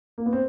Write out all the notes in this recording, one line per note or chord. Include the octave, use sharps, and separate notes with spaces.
A#3
B3
C4